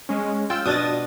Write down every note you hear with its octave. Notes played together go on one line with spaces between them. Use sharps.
G#3 C#4
F4 G5 E6
B2 D4 D#5 D#6 A6